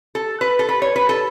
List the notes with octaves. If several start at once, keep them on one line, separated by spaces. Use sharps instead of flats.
A4
B4
A4
B4
C#5
B4
A4